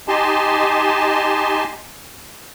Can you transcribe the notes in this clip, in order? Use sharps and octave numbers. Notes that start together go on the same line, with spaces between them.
D#4 G4 D#5 G#5 A5 C6